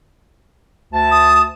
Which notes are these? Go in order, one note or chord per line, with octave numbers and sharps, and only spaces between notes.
D2 A5
D#6